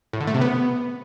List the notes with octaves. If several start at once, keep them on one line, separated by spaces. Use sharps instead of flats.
A2
D3
A3
C3
B3